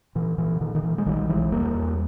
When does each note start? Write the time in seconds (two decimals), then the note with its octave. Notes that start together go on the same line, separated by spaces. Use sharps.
0.15 A#2 E3
0.38 A#2 E3
0.61 A#2 D#3
0.75 D#3
0.83 A#2 E3
0.98 G#3
1.06 B1 D#3 G3
1.29 B1 E3 G#3
1.52 E1 G3 A#3
1.75 E2